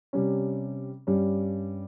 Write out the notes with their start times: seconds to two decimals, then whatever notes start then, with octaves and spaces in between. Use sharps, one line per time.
0.13 C3 G3 C#4
1.07 G2 G3 C#4